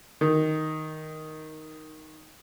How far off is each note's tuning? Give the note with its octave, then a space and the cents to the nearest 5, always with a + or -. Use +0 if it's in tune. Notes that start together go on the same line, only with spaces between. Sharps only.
D#3 +5